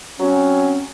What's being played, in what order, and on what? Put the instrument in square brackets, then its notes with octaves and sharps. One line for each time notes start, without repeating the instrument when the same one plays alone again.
[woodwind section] F#3 C4 C#4